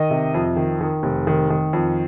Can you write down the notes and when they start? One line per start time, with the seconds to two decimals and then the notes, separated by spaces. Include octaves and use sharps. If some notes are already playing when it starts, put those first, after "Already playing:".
Already playing: D#3 D#5
0.11 C3
0.34 F2
0.56 D#3
0.81 D#3
1.03 F1
1.27 D#3
1.50 D#3
1.73 F2